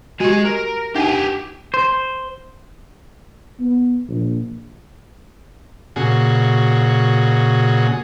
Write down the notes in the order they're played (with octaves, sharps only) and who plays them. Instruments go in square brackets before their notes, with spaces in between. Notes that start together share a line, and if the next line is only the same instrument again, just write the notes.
[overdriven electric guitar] G#3 G#5 [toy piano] F#4 G4
[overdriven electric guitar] A#4
[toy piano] D4 D#4 F#5 [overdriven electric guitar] G4 G#5
[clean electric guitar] C5
[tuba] B3
A#1
[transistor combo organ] A#2 C#3 F#4 G#4